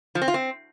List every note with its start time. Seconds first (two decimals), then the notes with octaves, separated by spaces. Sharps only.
0.15 F3
0.22 C4
0.28 F4
0.34 C4